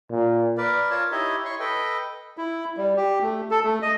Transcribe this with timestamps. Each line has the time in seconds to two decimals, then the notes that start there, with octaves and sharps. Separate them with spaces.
0.11 A#2
0.57 A#4 B4 D5
0.91 F4 A#4 C#5 A5
1.12 D#4 E4 G4 C#5 D#5 E5
1.45 E4 C#5 C6 C#6
1.60 A4 B4 D#5 G5
2.38 E4
2.77 G3
2.96 G4
3.22 A3
3.51 A4
3.64 A3
3.82 D#5